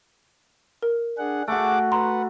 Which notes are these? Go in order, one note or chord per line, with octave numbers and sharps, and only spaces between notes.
A#4
D4 G#4 F#5
A3 F#4 G#4 F#5 D6
B4 F#5 A#5 C6